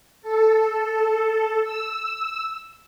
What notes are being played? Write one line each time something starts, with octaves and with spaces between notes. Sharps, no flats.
A4
E6